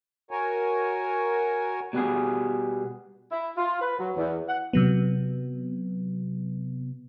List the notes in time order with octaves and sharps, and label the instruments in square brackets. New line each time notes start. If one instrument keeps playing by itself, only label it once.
[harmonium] F#4 A#4 C#5 G#5
[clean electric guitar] B2 G3 B3 G#4
[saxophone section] E4
F4
B4
F#3
E2
F#5
[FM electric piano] C3 F#3 B3